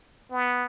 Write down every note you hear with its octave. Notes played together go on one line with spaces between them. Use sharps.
B3